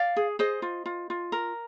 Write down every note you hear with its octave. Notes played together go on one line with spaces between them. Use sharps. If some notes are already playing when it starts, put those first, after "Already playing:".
Already playing: D5 F5
G#4
G#4 C5 D#5
F4
F4
F4
A#4